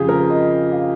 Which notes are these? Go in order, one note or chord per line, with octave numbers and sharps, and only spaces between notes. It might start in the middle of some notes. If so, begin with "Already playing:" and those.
Already playing: F2 C#3 F4 G4 G#4
A#4
D#5
F5